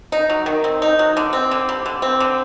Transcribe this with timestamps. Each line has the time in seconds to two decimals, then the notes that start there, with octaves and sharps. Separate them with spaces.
0.12 D#4
0.30 F#3
0.46 D#3
0.64 C4
0.82 D#4
0.99 F#3
1.17 D3
1.33 C4
1.51 D3
1.69 G3
1.86 D3
2.02 C4
2.20 D3